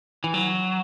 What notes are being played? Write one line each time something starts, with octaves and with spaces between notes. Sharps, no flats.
E3
F#3